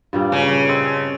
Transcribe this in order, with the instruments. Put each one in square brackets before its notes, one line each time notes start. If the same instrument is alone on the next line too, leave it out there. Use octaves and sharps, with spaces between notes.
[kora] G2 A#2 G3
[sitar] C#3
[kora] C4 A4 D#5